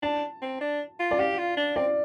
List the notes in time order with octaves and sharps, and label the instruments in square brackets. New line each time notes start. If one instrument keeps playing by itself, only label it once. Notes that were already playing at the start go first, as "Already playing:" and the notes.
[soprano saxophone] D4 [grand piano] A5
[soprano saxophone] C4
D4
F4
[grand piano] D5
[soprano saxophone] G4 [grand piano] F5
[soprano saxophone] F4
D4
[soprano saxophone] C4 [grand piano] D5